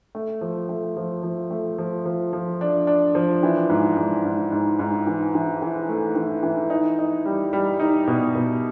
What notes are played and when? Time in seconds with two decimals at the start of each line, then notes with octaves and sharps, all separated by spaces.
0.15 A3
0.41 F3
0.69 A3
0.97 F3
1.23 F3
1.51 A3
1.78 F3
2.06 F3
2.33 F3
2.61 D4
2.87 D4
3.15 F3
3.43 E3
3.70 G#2
3.97 G#2
4.25 G#2
4.52 G#2
4.79 G#2
5.07 E3
5.35 E3
5.62 E3
5.89 A3
6.16 E3
6.43 E3
6.70 D#4
6.99 D#4
7.25 G3
7.53 G3
7.80 D#4
8.07 B2
8.35 B2